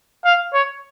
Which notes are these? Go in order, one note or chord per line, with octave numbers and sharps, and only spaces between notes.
F5
C#5